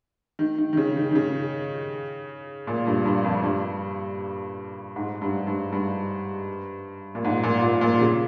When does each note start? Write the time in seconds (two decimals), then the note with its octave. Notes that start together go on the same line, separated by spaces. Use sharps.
0.39 D#3
0.58 D#3
0.73 D#3
0.77 C#3
0.96 D#3
1.11 D#3
1.15 C#3
2.67 A#2
2.87 G2
3.05 G2
3.24 F2
3.44 G2
4.96 G#2
5.22 G2
5.47 G2
5.72 G2
7.15 A#2
7.25 G#2
7.43 A#2
7.63 A#2
7.81 A#2
8.01 C#3